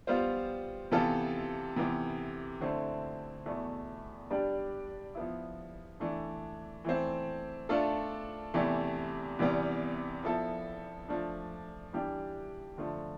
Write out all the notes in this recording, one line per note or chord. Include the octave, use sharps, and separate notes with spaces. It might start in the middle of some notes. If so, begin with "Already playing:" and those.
G3 B3 F4 C5
C3 E3 B3 F4 A4
C3 E3 B3
D3 A3 C4 E4
E2 B2 A3 E4
G3 D4 G4 B4 D5
F3 B3 E4
E3 A3 D4
E3 A3 C4
A3 D4 F4 A4
E2 C3 E3 A3
E2 C3 E3 G3 B3
F3 B3 E4 A4
F3 A3 D4
E3 G3 D4 G4
D3 F3 A3